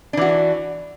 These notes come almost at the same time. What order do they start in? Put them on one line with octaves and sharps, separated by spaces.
D4 E3 F#4